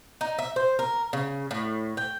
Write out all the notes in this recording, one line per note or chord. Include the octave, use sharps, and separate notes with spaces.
D#4
E5
C5
A#4
C#3
A2
G5